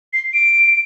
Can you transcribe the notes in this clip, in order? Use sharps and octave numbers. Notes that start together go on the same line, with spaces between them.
C7
D7